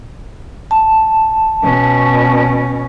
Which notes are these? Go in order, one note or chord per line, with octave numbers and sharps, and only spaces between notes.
A5
B2 C#4